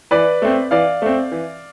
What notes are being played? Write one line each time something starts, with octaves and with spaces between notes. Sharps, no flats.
E3 B4 D5
A3 C4
E3 D5 F5
A3 C4
E3